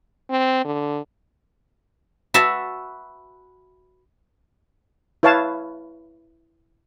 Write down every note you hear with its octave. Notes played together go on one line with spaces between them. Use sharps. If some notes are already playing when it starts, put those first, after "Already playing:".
C4
D3
F#4 B4 E5 A5
E4 B4 C#5 F5 A5